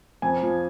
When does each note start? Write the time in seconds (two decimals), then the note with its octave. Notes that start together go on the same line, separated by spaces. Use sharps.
0.22 F2 G#5
0.43 F3